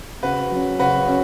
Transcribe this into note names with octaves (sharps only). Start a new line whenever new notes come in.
C#3 F#4 B4
F#3 C#4
C#3 F#4 B4
C#4